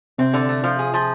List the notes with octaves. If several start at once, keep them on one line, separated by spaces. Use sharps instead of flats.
C3 C4
D3
A3
F3
G#4
F3